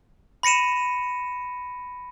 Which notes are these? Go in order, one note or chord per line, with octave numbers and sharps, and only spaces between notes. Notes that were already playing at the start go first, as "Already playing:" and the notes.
B5 A#6 C#7 D#7 E7